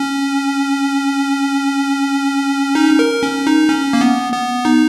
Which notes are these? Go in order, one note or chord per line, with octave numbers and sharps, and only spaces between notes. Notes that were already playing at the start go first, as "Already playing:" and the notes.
Already playing: C#4
D#4
A#4
C#4
D#4
C#4
A#3
B3
B3
D#4